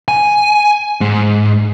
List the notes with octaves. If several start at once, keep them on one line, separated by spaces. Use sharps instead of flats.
G#5
G#2